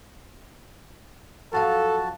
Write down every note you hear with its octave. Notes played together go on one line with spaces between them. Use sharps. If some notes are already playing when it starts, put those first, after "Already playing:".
F#2 F3 F#4 A4 F5 A5